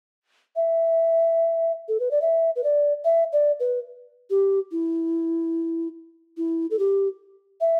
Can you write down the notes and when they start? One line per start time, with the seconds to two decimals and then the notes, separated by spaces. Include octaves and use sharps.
0.56 E5
1.88 A4
2.00 B4
2.11 D5
2.22 E5
2.56 B4
2.64 D5
3.05 E5
3.33 D5
3.60 B4
4.30 G4
4.72 E4
6.37 E4
6.71 A4
6.79 G4
7.61 E5